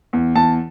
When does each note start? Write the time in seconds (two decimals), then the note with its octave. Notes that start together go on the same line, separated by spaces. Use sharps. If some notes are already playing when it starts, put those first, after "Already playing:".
0.13 E2
0.35 E2 A5